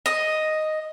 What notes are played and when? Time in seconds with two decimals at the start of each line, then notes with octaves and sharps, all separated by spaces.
0.06 D#5